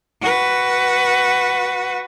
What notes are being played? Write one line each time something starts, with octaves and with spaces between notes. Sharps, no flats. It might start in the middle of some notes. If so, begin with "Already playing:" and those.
F#4 B4